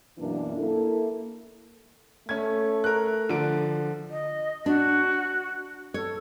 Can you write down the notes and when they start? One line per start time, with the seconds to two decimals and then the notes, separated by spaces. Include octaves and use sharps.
0.18 F#2 B2 E3 A#3 D4
0.56 A#3 E4 A4
2.29 A3 C#4 G#6
2.84 A#4 F#6
3.29 D3 F3 D7
4.10 D#5
4.66 D4 F#4
5.94 A4 C#5